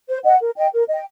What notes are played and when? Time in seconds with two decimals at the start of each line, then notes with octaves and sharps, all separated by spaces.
0.08 C5
0.24 D#5 F#5
0.41 A#4
0.56 D#5 G5
0.73 A#4
0.89 D#5 G5